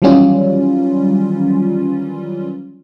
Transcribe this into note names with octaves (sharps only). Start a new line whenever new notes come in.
D#3 E3 F#3 G3 C#4 F4